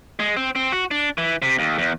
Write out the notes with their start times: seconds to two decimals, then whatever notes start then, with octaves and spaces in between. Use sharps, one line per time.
0.20 G#3
0.37 C4
0.55 C4
0.72 F#4
0.91 D4
1.18 E3
1.42 C3
1.59 D#2
1.78 E2